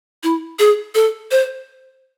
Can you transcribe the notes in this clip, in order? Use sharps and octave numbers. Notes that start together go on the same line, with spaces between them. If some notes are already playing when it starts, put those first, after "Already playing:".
E4
G#4
A4
C5